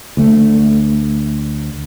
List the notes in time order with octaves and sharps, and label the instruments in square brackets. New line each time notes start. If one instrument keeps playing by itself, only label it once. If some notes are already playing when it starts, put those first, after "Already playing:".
[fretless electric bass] D2 A3